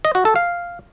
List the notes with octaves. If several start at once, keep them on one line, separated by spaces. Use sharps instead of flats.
D#5
F#4
A4
F5